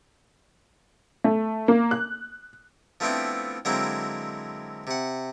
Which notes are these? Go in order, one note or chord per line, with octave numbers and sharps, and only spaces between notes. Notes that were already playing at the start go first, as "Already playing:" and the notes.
A3
A#3
F#6
F3 A3 B3 C4 D4 E4
D3 F#3 G#3 A#3 C4 E4
C3 F#5